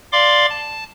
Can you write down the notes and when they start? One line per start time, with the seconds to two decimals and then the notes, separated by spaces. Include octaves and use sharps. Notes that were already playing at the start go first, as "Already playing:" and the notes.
0.12 D5 F5 C6 D6
0.50 A5